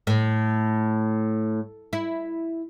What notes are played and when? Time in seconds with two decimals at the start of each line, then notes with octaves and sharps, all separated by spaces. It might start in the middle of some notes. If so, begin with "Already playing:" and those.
0.07 A2
1.93 E4